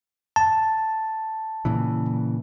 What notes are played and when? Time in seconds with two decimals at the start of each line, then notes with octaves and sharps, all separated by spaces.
0.36 A5
1.65 A#2 C#3 E3